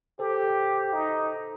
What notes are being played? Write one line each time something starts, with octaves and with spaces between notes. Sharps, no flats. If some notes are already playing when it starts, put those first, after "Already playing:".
G4 A4 C5
D#4